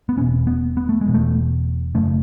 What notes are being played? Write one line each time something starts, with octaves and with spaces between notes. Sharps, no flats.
B3
E1 E2 B2 C#4
B3
B3
A3
G#3
E1 E2 B2
A3
F#1 F#2 C#3 A3